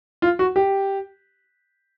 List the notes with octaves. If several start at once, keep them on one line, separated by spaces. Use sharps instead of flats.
F4
F#4
G4